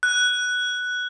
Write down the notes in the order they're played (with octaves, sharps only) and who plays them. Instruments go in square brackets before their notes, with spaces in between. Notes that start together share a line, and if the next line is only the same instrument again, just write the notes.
[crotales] F#6